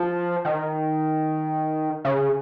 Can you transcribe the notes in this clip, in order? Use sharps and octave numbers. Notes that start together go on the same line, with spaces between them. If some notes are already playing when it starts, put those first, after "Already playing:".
Already playing: F3
D#3
C#3